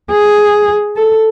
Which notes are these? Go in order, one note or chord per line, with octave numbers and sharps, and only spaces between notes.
G#4
A4